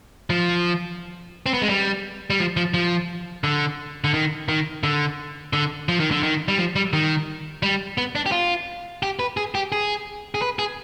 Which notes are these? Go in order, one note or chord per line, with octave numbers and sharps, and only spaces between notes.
F3
C4
B3
G#3
G3
G3
F3
F3
F3
D3
D3
D#3
D#3
D3
D3
F3
D#3
D3
D#3
G3
F3
G3
D#3
G3
B3
D4
G4
F4
G4
B4
G#4
G4
G#4
G#4
B4
G#4